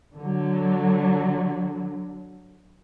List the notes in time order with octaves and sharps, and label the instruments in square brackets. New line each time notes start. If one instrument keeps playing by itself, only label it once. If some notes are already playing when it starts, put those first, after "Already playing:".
[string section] D3 F#3